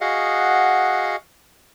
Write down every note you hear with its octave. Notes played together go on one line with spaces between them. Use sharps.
F#4 G#4 D#5 F5 F#5